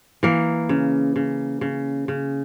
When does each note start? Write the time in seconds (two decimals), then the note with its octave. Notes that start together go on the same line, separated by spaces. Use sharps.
0.23 E3 A#3
0.69 C#3
1.16 C#3
1.61 C#3
2.08 C#3